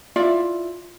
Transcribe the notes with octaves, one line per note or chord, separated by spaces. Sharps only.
E4 F4 D5 E5